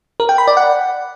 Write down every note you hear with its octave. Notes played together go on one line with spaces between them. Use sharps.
A#4
G5
B5
D5
F#5